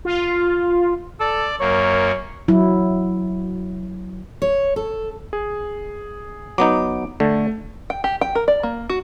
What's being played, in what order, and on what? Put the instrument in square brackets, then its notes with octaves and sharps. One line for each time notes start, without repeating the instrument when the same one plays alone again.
[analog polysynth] F4
[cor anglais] A4 [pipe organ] D5
[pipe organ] F#2 A#3 [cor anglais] C#5
[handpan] F#3 E4
[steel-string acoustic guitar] C#5
A4
[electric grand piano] G#4
[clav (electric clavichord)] F#3 B3 D#4 [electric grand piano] D6
[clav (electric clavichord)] D3 [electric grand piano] A3
[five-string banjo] G5
G4
G5
A#4
D5
A#3
F#4